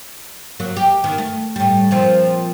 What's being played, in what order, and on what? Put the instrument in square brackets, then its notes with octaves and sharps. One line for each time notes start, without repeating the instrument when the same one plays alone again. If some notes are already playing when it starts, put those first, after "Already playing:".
[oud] F#3 A#3
G4
D#3 B3
A3
A2 G3
A#2 F3 C4